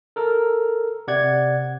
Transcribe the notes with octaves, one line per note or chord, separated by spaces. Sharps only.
A4 A#4
C3 D5 F#5 G#6